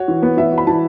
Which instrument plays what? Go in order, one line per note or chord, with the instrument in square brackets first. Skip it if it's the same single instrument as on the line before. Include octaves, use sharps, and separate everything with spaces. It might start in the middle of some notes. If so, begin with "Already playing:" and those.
Already playing: [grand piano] F#4 [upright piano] C#5
[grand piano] E3
B3
[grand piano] E3 [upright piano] E5
[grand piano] F#4
[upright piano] B5
[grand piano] E3 [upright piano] A5